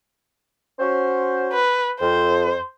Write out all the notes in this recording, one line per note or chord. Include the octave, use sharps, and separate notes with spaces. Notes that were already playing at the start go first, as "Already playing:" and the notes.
C#4 F#4 C5
B4
F2 C5